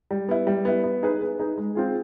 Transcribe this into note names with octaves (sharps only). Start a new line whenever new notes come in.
G3
B3 E4
G3
B3 E4
B3
D#4 G#4 B4
B3
D#4 G#4 B4
G#3
C4 F4 G#4